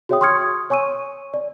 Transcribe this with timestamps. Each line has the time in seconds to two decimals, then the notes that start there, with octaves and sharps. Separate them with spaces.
0.09 F#4 G#4 C#5 E5 G5 D#6
0.21 C6 C#6 D#6 F6 G#6 C#7
0.70 C#5 G#5 C#6 E6 D#7
1.34 D5